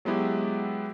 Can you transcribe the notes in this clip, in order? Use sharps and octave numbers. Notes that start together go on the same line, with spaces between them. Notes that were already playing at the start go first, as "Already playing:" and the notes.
F#3 G#3 B3 E4 G4